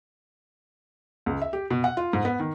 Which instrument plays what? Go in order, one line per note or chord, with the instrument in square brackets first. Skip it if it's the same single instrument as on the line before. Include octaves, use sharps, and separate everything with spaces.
[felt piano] C#2
E5
G4
B2
F#5
F4
G#2
B3
D#3